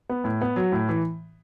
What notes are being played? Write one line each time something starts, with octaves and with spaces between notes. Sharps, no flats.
B3
A2
B3
F#3
A2
E3